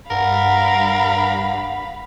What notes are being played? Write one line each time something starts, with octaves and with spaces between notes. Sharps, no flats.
G2 A#4 F5 F#5 B5